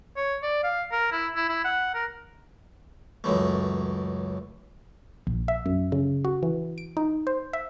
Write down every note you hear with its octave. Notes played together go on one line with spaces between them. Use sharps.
C#5
D5
F5
A#4
E4
E4
E4
F#5
A#4
C#2 F#2 E3 A3
A#1
E5
F#2
C#3
F#4
E3
D7
D#4
C5
E5